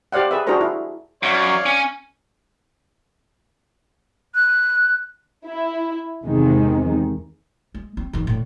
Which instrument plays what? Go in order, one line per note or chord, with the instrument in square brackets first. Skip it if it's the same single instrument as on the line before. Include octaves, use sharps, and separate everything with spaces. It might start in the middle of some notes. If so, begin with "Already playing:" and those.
[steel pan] G4 C5 D5 F5 F#5
G#4 B4 E5
D4 F#4 G#4 A#4 C5 A#5
E4
[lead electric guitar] F#2 [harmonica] C#5 D5 F5
[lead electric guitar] C#4 G#5
[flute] F#6
[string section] E4
E2 C3 D#3 G#3
[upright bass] G#3
C4
E2 D#3
A2 D3